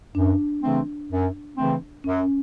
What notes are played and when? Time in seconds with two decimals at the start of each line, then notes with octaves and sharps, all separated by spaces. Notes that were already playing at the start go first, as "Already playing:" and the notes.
0.15 F#2 D4
0.62 C#3 E3 A3 C4
1.10 F#2
1.57 C#3 E3 A3 C4
2.04 F#2 C#4